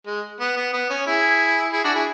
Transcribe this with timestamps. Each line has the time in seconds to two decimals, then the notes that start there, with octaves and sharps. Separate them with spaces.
0.06 G#3
0.40 B3
0.57 B3
0.73 B3
0.90 C#4
1.06 E4 G#4
1.73 E4 G#4
1.84 D4 F#4
1.95 E4 G#4